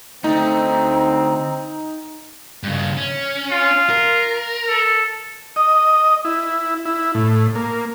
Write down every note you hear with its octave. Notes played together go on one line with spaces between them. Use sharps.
D3 A3 C4 D#4 A#5
G2 C#3
C#4
F4
A#4
A4
D#5
E4
E4
A2
A#3